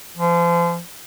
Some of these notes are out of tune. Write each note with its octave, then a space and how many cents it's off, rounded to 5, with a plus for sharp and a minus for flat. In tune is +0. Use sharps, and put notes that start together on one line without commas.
F3 -35